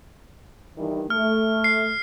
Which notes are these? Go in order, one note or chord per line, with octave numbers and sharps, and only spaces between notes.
G2 D#3 E3
A3 F6
C7